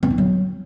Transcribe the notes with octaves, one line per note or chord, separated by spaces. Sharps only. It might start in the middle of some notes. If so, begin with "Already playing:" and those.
C4
D#4
F#3